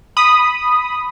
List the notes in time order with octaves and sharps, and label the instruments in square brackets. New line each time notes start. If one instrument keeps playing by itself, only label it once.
[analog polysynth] B5 D#6